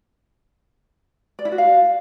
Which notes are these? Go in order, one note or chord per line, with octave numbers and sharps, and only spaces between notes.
D5
E4
F#4
F5